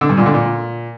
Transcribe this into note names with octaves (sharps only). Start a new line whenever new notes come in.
D3
G2
A#2
D3
A#2